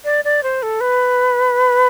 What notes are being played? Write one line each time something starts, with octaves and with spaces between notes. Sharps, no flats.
D5
D5
C5
A4
B4